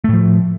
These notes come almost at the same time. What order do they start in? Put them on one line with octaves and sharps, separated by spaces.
A3 A2 F3